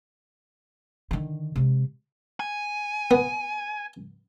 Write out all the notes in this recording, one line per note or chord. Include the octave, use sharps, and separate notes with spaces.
D3 D#3
C3 G#3
G#5
B3